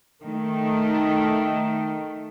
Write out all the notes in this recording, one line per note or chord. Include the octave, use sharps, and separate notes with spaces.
D#3 A3